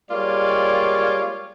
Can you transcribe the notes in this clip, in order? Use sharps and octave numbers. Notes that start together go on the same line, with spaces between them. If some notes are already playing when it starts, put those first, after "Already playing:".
G3 G#3 A#3 F4 C#5 D5